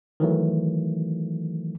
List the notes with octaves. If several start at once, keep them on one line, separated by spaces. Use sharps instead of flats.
D#3 E3 F#3 A3